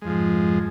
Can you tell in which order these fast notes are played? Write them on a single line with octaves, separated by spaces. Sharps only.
G#3 F2 F3 G#2